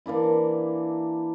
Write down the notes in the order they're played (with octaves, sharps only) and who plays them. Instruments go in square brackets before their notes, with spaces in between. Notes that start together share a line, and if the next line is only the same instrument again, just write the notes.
[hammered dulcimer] E3 A#3 D4 E4